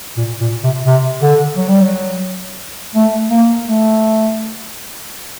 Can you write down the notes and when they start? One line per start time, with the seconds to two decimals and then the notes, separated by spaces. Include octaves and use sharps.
0.17 A#2
0.41 A#2
0.64 C3
0.86 C3
1.22 D3
1.57 F#3
1.68 G3
1.81 F#3
2.95 A3
3.31 A#3
3.66 A3